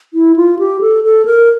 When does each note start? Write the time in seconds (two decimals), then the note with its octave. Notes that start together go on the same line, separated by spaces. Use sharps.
0.14 E4
0.36 F4
0.59 G4
0.81 A4
1.04 A4
1.26 A#4